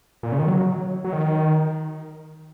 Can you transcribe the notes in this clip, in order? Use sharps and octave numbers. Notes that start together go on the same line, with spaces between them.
A#2
C#3
D#3
F#3
F#3
D#3